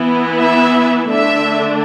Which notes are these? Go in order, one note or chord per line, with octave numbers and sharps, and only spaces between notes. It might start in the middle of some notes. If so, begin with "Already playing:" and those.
Already playing: E3 B3 E4
E5
D3 A3 D4 E5